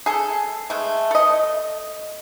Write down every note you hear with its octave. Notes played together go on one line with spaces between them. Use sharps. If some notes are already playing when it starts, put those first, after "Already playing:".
G#4 A4
G#3 A3
A4 D#5